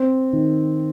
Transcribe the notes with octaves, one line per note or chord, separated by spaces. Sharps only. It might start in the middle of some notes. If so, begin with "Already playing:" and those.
Already playing: C4
D#3